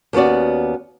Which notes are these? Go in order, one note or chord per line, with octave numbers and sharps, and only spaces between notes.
D#2 B3 C#4 F#4 D5